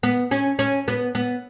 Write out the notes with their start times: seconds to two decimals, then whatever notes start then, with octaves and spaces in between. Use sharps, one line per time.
0.03 B3
0.31 C#4
0.59 C#4
0.88 B3
1.15 B3